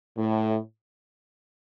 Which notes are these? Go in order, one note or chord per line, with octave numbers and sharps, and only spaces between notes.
A2